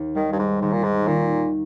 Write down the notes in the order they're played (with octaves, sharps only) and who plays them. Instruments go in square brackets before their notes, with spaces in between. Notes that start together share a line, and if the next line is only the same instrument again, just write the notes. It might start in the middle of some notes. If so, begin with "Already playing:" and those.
Already playing: [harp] D#2
[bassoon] D#3 [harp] G3
[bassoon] G2
G#2
[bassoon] G#2 [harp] D#3
[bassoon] A#2
G#2
[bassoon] A#2 [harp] D#3